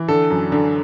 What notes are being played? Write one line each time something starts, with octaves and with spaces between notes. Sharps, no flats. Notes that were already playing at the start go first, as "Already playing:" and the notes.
Already playing: E3
D3 A4
F#2
D3